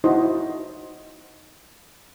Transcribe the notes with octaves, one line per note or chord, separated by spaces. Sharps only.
D#4 E4 F#4 C5 D#5